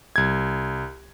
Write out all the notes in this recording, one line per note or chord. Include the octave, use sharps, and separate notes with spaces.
C2 G#6